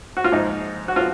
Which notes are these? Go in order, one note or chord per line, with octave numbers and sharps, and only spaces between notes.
F#4
F4
G#2 F3 D#4
F#4
F3 F4